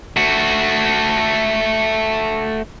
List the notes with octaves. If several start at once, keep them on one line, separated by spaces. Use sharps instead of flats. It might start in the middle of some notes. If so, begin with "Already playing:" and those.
A3 F#4